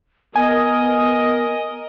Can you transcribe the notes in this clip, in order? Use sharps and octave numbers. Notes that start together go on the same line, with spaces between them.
B3 A#4 D#5 G#5